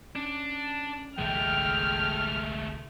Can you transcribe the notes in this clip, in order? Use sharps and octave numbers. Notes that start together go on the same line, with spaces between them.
C#4 D4
G1 C2 E3 G#3 A3 G5 F6